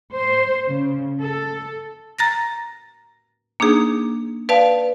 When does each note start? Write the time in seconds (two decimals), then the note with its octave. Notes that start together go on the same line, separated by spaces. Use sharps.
0.13 C5
0.69 C#3
1.21 A4
2.19 A#5 A6 A#6
3.60 A#3 D4 D#4 G#4
4.49 B4 D5 F5 A5